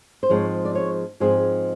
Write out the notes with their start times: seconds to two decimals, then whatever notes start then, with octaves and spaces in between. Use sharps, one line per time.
0.23 C5
0.29 G#2 F3 G#3 C4 C#5
0.65 D5
0.75 C#5
1.20 G#2 F3 G#3 C4 G#4